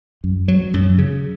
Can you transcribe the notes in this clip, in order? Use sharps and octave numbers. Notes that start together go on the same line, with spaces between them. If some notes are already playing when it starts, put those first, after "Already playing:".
F#2
F#3
F#2
C#3